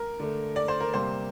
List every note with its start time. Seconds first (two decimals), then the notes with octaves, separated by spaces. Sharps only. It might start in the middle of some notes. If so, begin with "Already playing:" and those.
Already playing: A#4
0.20 D3 A3
0.56 D5
0.68 C5
0.80 A#4
0.93 C3 G3 A#3 C5